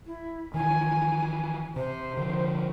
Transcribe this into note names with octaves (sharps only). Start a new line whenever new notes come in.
E4
D#3 E3 G#5
C3 C5
D3 F3